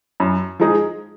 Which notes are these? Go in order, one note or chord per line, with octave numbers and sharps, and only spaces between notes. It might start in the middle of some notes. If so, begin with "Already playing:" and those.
F#2
F3 G#3 D#4 G#4